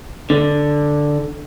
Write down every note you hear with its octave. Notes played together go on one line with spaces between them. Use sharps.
D3